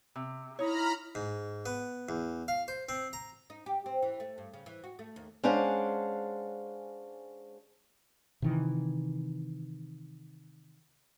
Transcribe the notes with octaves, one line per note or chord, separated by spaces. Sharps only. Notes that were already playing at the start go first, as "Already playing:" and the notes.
C3
D#4 E4 C#5 A#5 B5 F6
G#2
B3
E2
F5
C5
C4
A#5
D#4
G4
C4
E3
A3
G2
C#3
E3
F#4
A3
D#2
G#3 C#4 D4 C5 F5 F#5
C3 D#3 E3